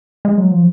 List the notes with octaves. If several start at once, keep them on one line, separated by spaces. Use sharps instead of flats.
G#3
F#3
F3